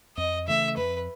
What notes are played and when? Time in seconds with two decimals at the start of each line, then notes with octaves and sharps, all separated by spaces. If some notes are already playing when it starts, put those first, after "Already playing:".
0.17 F2 D#5
0.47 C#3 E3 A3 E5
0.77 F2 B4